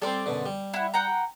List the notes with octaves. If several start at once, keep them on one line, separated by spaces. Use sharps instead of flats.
G3 C4 A4 D5 C6
F#2 B2 D3
G3
E4 F#5
F#5 G5 A#5